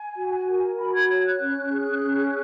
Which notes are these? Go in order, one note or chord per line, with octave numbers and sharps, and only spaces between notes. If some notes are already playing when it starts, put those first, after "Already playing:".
Already playing: G#5
F#4
A#4
F#4 B5
G#6
C#5 G#6
F#6
C#4
G#4
C#4